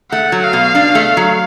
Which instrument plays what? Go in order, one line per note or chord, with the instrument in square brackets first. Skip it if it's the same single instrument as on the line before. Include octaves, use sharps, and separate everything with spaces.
[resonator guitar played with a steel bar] A3 [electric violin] F#5
[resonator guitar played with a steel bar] F#3
[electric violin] F5
[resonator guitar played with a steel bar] B2
D4
A3
F#3